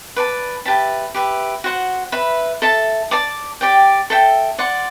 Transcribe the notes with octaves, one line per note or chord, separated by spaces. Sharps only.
B4 D5 A5
G4 B4 E5 A5
G4 B4 E5
F#4 C5 F#5
B4 E5 B5
A4 E5 A5
D5 A5 D6
G4 D5 G5
A4 E5 G5
D5 F#5 C6